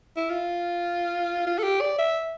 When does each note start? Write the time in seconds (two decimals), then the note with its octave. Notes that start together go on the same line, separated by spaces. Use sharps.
0.17 E4
0.30 F4
1.47 F4
1.59 A4
1.64 G4
1.81 D5
1.99 E5